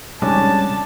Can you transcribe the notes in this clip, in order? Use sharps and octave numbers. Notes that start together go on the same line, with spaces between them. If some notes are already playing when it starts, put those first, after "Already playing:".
C3 G3 G#3 C#4 D4 C#5 G#5 A5